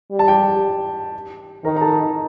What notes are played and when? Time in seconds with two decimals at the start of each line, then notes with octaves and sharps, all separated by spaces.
0.11 G3
0.19 A5
0.28 G4 G5
1.64 D#3 A#4 A#5
1.77 A#5
1.81 A4 A5